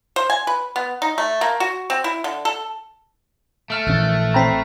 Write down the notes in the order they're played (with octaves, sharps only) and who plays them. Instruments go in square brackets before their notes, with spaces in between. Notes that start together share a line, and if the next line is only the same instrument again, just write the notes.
[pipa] C5
G#5
B4
B3
D#4
A3
A#3
F#4
C4
E4
D3
A4
[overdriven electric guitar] A3 [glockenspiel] A5 F6 D7
[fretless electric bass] A#1 E3 C#4 [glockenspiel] E6 F#6 A6
[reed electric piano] C4 G5 A#5 [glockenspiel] B5 B6 C7